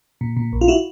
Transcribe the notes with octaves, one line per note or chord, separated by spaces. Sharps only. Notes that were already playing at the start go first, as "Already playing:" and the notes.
A#2
A#2
A#1
F4
E4 F#4